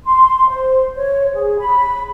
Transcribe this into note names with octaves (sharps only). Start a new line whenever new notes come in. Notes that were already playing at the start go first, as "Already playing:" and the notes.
C6
C5
C#5
G#4
B5